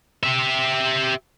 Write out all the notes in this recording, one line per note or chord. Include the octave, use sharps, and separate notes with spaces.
G4 E5